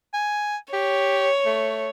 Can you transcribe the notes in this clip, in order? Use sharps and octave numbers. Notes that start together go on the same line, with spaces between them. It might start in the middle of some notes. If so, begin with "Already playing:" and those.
G#5
G4 C#5
A3